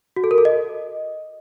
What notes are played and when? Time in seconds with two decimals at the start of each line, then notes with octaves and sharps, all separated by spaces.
0.16 F#4
0.24 A4
0.31 A#4
0.38 A4
0.45 D#5